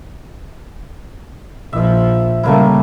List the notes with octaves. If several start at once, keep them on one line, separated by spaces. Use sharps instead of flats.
A#1 F3 E5
C#3 G3 A3 A#3 E4